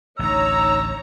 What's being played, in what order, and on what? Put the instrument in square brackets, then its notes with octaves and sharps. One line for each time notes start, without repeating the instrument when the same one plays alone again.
[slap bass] A1 D2 [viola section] D#4 C#5 A#5 [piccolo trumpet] E6